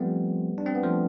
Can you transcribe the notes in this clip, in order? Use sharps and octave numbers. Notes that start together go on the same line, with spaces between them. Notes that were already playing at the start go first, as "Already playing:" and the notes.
Already playing: F3 G3 A3 B3 C4
D4
C4
B3
F3 A3